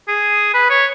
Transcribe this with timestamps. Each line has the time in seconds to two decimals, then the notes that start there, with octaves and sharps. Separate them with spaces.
0.08 G#4
0.54 B4
0.70 C#5